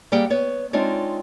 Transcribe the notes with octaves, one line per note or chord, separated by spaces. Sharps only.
G3 A#3 G4 G#4 F#5 G5
B3 C#5
G#3 C4 D4 D#4 F4 C#5